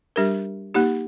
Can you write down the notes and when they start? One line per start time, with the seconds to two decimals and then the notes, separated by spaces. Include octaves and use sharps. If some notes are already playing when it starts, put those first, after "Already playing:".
0.16 G3 D4 G4 A#4
0.74 A#3 D#4 G4